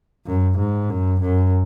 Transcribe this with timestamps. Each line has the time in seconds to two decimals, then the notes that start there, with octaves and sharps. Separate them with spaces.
0.26 F#2
0.58 G#2
0.89 F#2
1.22 F#2